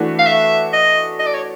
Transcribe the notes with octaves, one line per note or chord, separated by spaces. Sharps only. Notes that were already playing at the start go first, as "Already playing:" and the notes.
Already playing: E3 A3 D4 F#4 B4
F5
E5
D#5
D#5
D5
C#5